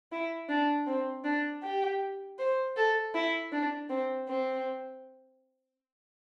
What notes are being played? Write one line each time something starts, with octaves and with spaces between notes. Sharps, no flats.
E4
D4
C4
D4
G4
C5
A4
E4
D4
C4
C4